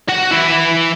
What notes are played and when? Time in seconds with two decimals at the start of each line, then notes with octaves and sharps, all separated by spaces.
0.09 F#4 F#5
0.31 E3 E4